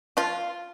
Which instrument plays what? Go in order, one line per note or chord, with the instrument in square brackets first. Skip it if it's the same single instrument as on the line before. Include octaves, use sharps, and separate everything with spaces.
[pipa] F3 F4